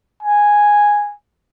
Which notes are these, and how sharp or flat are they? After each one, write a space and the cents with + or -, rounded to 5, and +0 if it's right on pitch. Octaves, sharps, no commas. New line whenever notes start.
G#5 -5